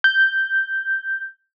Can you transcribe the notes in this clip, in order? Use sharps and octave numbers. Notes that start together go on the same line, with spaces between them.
G6